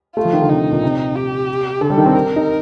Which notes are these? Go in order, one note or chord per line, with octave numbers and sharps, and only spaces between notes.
A3 F4
F3
D#3
D3
C3 D#4
A#2
C3
G4
D3 A4
G3
D#3
C4
A#4
D#4